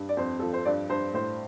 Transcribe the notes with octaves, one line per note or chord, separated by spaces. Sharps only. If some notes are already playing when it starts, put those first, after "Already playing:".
Already playing: G2
D5
F2 C5
F3 A4
C5
G2 D5
G2 C5
A2 C5